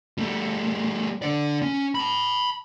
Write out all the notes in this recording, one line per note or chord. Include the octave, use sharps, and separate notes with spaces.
G3 A3
D3 D5
C#4
A5 B5